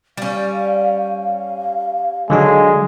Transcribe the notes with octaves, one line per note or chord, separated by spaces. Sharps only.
G3 C#4 F5
D3 F#3 G#3 D4